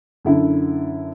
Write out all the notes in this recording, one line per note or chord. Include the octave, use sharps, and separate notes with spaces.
F#2 D3 E4